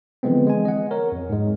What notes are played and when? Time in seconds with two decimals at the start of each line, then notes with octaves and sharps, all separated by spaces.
0.23 D3 E3 F3 G#3 B3 C4
0.47 G#3 G#5
0.65 D#5 F#5
0.91 A#4 C#5
1.12 F2
1.29 G#2 G#3